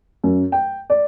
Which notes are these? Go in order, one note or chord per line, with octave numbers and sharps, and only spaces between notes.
F#2
G5
D5